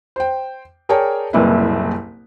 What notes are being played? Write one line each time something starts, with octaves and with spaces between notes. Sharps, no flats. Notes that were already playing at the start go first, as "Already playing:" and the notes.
C5 G5
G#4 A#4 C#5 D5 G5 A5
F#1 C2 A#2 E4 B4